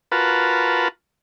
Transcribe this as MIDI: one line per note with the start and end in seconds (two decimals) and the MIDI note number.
0.12 0.88 65
0.12 0.88 66
0.12 0.88 70
0.12 0.88 71
0.12 0.88 81